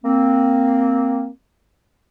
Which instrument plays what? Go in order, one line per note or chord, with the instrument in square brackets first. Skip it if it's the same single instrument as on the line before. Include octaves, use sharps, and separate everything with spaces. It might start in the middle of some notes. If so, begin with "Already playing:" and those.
[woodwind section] A#3 C4